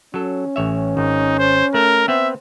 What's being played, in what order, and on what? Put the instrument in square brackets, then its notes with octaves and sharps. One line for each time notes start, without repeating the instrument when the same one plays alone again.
[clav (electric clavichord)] F#3 A4 [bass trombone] C#4
[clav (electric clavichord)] A1 C#5 E5
[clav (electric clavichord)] G#1 [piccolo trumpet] D#4
[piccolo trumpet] C5
[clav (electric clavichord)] A3 [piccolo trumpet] A#4
[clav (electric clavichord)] B3 C4 C5 [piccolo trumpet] E5